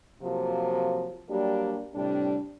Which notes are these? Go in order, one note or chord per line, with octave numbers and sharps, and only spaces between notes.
C3 F3 F#3 A#3 C4
F#3 G3 A#3 D4 G4
A2 C3 G3 D4